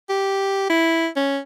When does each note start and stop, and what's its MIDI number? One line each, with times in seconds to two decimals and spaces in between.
0.09 0.69 67
0.70 1.07 64
1.16 1.39 61